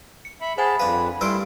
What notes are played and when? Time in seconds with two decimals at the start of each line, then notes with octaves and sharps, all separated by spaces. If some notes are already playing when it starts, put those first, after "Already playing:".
0.25 C#7
0.41 E5 B5
0.58 G#4 C5 F#5 G#5 A5 B5
0.80 F2 D4 B4 F5
1.21 G2 G3 A3 E4 A#4 C6 E6 D7